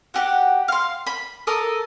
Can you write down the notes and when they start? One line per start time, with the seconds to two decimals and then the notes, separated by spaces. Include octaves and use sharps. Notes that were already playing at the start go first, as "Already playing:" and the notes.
0.14 F#4 G4 F#5
0.68 F5 C6
1.07 B5
1.47 A4 A#4 D#6